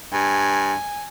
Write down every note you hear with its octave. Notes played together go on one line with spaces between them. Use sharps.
G2 G#5